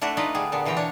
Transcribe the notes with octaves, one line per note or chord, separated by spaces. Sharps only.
A3 D4 E4 F#4
D4 D#4 F4 B4 D5 D#5
D3 G3 G#4
A#2 D3 B3
B2 E3 F4 G5 A#5
D4 C#5